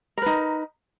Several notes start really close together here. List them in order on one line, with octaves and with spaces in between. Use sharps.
A#4 B4 D#4